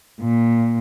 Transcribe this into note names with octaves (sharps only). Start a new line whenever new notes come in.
A#2